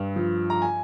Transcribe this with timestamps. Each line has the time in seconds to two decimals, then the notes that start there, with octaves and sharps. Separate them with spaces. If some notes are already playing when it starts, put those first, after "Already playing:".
Already playing: G2
0.16 F3
0.50 A#5
0.62 G#5